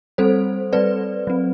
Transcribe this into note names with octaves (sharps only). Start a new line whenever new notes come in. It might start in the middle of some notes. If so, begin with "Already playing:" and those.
G3 C4 A4 C5
G3 C4 B4 D5
F#3 C4